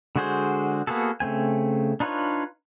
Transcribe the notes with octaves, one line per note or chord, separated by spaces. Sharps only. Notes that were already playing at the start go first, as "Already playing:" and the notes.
D3 G#3 F#4 G#4 C5
A#3 B3 F#4 G#4 A4
C#3 A3 C4 G#5
D4 D#4 F4 B4 C#5